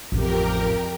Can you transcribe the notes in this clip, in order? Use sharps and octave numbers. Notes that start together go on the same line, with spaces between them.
A1 F2 A2 G4 A#4